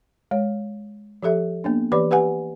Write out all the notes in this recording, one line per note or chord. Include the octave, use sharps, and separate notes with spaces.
G#3 C#5
F3 G4 A4 E5
A#3 B3 D4
E3 G4 B4 D5 B5 D6
G4 B4 F#5 G#5